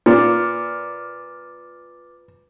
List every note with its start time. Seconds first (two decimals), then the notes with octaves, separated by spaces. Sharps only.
0.06 A#2 B4 D6 A6